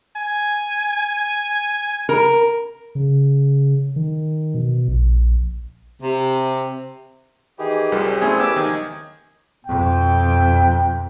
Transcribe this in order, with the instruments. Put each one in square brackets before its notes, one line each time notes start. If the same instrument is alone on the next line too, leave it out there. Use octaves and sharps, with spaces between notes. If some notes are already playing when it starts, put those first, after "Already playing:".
[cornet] G#5
[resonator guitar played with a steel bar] A#4
[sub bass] C#3
D#3
B2
A#1
[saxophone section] C3
[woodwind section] D#3 E3 [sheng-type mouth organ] G4 G#4
[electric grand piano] C2 G3 [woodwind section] F#2 A#2 F3
[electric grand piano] A3 C#4 [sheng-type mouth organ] C4 E4 [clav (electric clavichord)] G#4
[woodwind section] D#2 C3 D6 [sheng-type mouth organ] B3 B4 [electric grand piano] G5 E6
[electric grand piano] D#3 [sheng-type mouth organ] D#4 G#5
[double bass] F2 B2 [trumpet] G5